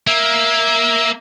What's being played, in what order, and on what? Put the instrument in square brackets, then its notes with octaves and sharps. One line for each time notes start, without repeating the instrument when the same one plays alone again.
[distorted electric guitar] A#3 [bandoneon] E5